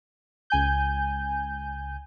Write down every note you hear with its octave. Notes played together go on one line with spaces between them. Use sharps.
C#2 G#5 G6